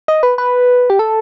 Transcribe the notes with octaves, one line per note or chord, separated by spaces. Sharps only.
D#5
B4
B4
G4
A4